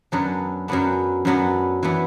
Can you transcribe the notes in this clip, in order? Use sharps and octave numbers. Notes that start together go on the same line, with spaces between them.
F#2 F#3 B3 D4
F#2 F#3 B3 D4
F#2 F#3 B3 D4
E3 B3 D4